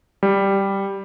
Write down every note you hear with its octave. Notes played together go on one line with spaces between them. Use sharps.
G3